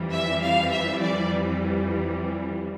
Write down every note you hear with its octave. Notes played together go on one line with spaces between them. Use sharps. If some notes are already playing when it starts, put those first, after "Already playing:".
Already playing: F2 E3 G3
E5
F5
E5
D5